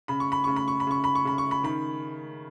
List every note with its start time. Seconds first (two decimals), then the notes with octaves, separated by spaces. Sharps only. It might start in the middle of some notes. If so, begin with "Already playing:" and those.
0.08 C#3 B5
0.20 C#6
0.32 B5
0.44 C#3 C#6
0.56 B5
0.68 C#6
0.80 B5
0.87 C#3 C#6
1.04 B5
1.15 C#6
1.25 C#3 B5
1.38 C#6
1.51 B5
1.64 D#3 B5